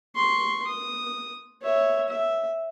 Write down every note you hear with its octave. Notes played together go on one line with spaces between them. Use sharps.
C6 C#6
D#6
C#5 E5
E5